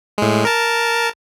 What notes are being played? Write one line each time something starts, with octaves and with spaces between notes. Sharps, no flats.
A2 G#3
A#4 A5